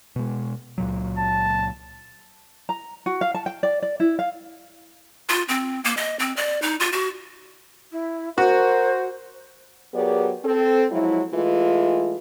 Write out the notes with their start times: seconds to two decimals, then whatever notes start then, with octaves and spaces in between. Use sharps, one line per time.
0.16 B2 G#3
0.78 C#2 A#2 F#3
1.18 A5
2.69 A#5
3.06 F#4
3.21 F5
3.35 A5
3.46 G5
3.63 D5
3.82 D5
4.00 E4
4.19 F5
5.29 F4
5.49 C4
5.84 A#3
5.97 D#5
6.19 C4
6.37 D5
6.62 D#4
6.80 F4
6.93 F#4
7.92 E4
8.38 F#4 A#4 C5
9.94 F#3 B3 G4 G#4 A#4 D5
10.44 C4 A4
10.91 F3 F#3 G#3 E4
11.34 E3 G#3 A3 F4